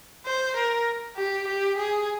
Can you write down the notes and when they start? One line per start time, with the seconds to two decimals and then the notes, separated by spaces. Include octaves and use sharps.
0.26 C5
0.57 A#4
1.17 G4
1.48 G4
1.78 G#4